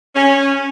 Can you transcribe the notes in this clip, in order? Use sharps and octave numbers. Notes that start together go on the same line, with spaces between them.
C#4